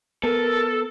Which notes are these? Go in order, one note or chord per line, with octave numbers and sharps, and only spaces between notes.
B3 A4 A#4